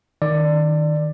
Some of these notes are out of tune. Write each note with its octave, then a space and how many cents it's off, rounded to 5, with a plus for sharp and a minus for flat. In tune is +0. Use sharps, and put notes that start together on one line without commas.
D#3 +0 D5 +10